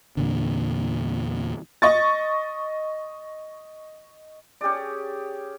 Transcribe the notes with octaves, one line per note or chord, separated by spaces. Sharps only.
E2 A#2 D3
D#5 C#6 A6
C#4 G4 G#4 D5